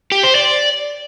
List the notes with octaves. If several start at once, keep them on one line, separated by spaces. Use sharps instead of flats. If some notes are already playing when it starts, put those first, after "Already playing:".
G4
C5
D5